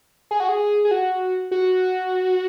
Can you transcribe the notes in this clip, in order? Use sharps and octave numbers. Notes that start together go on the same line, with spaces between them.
G#4
F#4
G#4
G#4
F#4
F#4